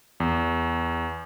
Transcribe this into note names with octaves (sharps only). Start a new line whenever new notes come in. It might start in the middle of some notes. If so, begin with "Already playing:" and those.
E2